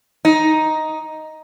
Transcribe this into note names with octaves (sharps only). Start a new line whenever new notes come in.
D#4